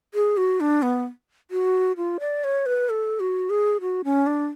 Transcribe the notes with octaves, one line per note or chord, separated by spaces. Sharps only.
G#4
F#4
D4
B3
F#4
F4
D5
C#5
B4
A4
F#4
G#4
F#4
C#4
D4